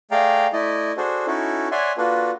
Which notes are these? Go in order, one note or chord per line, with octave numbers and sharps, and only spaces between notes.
A3 G#4 D5 F5 G5 A#5
A3 E4 D5 D#5
D4 F#4 G#4 A4 C5
C#4 D#4 E4 F#4 A4
C#5 D5 E5 F#5 G#5 C6
A#3 D4 F4 F#4 A4 B4